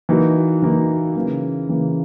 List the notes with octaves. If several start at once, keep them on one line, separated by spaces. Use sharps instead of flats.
E3 A#3 D#4 F#4
E3 A#3 D#4 F#4
C#3 E3 A#3
C#3 E3 A#3